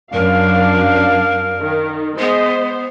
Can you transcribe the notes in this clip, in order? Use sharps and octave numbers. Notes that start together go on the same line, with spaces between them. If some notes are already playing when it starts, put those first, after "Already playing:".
F#2 D4 A#4 F5
D#3
G#3 B3 C5 D#5